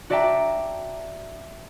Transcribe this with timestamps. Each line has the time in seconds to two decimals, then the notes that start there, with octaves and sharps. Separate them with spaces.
0.10 F#4 D5 E5 G5 A5 A#5